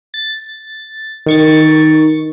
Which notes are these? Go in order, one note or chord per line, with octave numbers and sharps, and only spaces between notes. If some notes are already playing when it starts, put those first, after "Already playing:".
A6
D#3 C#6 A6